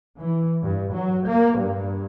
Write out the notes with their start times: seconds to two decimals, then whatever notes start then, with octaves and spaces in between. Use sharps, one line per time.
0.19 E3
0.63 G2
0.93 F#3
1.25 A#3
1.58 G2